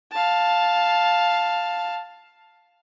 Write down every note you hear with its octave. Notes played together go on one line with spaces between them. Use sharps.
F5 A5